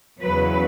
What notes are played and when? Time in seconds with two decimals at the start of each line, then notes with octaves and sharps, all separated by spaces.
0.22 E2 C#3 F#3 B4